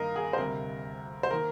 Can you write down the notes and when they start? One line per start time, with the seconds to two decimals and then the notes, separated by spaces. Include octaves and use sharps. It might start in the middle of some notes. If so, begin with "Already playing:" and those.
Already playing: G2 D#3 G3 A#3 A#4 D#5 F5
0.16 G#4
0.33 C5
0.38 D2 C3 G3 A#4
1.23 C5
1.31 D#3 A#3 A#4